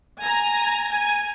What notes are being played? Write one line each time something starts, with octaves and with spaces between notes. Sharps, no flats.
G#5 A#5
G#5